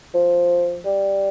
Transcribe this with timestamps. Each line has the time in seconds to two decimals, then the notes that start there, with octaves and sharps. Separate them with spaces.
0.14 F3
0.85 G3